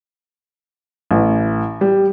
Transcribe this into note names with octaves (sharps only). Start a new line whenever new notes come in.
A1
G3